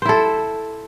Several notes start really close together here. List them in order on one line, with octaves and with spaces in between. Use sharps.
C5 E4 A4